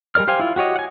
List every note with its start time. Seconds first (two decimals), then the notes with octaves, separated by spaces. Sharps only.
0.15 G3 G#3 A#4 D5 F6
0.28 G4 C5 F5 G5 G#5
0.40 E4 F4
0.56 F#4 G4 C#5 D#5
0.76 F#5 G#5